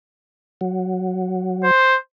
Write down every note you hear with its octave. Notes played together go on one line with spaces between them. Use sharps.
F#3
C5